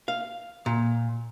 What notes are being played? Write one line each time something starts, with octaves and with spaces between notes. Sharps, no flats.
F5
A#2